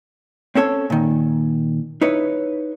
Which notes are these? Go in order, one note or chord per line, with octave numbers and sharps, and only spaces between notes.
C4 C#4 A4 C#5
A#2 D#3
D#4 E4 B4 C#5